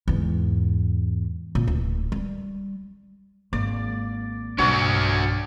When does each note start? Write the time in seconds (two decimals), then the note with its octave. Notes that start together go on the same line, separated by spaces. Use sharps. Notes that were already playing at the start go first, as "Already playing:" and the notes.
0.08 E2 G#2
1.55 A#2
1.68 D1
2.12 G3
3.53 G#1 A#3 D5
4.58 B1 G2 D4 F#4 C#5 D5